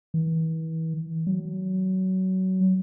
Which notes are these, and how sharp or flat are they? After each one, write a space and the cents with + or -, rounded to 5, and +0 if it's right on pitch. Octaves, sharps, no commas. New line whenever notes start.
E3 -35
F#3 +20